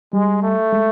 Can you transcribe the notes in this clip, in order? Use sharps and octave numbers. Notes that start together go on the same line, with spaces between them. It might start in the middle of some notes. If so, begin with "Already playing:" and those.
G3 G#3
A3
G#3